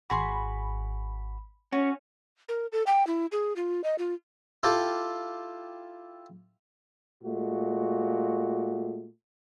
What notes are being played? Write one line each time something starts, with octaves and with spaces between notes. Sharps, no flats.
G#1 F#4 G#4 B5 C6
C#4 F#4
A#4
A4
G5
E4
G#4
F4
D#5
F4
E4 F4 G4 A4 G5 A5
A#2 G#3 A3 F#4